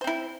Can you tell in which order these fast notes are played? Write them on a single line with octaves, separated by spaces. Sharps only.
C5 C4 E4